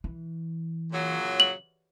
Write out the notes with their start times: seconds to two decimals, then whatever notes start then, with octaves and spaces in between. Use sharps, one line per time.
0.04 E3
0.92 A#2 C#3 F#3
1.40 F#7